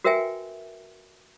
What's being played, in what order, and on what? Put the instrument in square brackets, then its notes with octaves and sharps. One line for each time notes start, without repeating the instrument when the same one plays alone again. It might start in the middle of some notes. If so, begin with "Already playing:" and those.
[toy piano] F#4 A#4 B4 E5 G5 G#5